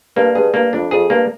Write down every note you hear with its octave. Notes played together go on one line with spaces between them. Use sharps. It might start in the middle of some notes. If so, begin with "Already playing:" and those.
G2 A#3
G2 G#4
G2 A#3
F2 D4
F2 G#4
G2 A#3